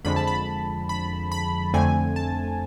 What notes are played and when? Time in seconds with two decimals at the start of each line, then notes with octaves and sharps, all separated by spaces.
0.05 F2 D3 F3 G#3 B5
0.16 A5
0.27 B5
0.89 B5
1.32 B5
1.74 F2 D3 A3 C4 G#5
2.16 A5